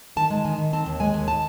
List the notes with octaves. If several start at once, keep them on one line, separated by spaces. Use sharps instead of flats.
D#3 A5
G#3
D#3 G#5
D#3
C4 A5
D#2
G#3 G#5
D#2
A5